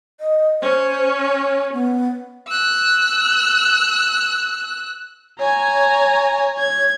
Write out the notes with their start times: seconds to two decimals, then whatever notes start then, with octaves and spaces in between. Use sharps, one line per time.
0.20 D#5
0.62 C#4 C5
1.19 C#5
1.73 B3
2.48 E6 F#6
5.39 C#5 G#5 A#5
6.59 G#6